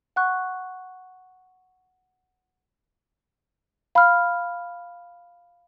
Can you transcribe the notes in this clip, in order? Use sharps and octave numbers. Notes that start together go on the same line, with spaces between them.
F#5 C#6 F#6
F5 B5 F6